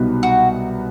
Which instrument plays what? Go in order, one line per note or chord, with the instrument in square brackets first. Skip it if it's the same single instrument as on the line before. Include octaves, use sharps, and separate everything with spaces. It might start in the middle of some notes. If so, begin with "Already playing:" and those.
Already playing: [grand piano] C2 B2 F#3 B3 D#4
[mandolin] F#4